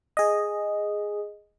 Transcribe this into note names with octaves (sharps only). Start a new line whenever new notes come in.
G#4 D#5